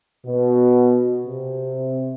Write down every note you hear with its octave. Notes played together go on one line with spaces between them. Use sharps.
B2
C3